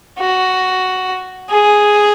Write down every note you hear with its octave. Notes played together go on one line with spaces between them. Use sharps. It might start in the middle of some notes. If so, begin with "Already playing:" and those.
F#4
G#4